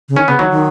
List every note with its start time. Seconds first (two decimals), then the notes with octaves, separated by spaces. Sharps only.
0.09 C#3
0.16 D#3 C#4
0.27 C#3 B3
0.39 D#3 F#3
0.50 D#3